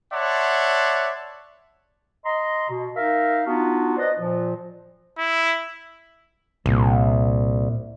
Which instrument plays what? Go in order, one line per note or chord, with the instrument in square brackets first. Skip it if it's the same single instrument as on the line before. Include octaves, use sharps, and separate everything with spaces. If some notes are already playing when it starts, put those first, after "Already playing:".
[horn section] C#5 D5 E5 F#5 A5 C6
[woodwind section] D#5 A#5 C6
B2
D#4 A#4 E5 F5
B3 D4 D#4 F4 F#4
B4 C5 D5 D#5
A#2 F3
[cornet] E4
[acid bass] C2 [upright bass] A#2